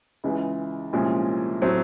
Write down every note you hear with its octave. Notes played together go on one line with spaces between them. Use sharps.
C#2 C#3 E3 G#3
C2 A#2 F3 G#3 C#4
A2 F#3 A3 C4